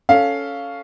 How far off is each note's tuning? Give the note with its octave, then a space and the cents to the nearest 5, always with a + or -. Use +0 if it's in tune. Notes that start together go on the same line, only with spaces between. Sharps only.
C#4 +10 A4 +0 F5 +0